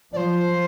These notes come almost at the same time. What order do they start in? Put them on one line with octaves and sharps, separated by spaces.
F3 D5 C5